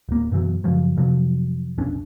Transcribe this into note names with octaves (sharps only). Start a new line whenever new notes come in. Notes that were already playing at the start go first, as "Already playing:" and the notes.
D1 A#3
F#2 B2 E3 F#3
F#2 C#3 F3 F#3
F2 C3 F3 F#3
F1 B1 C#4 D4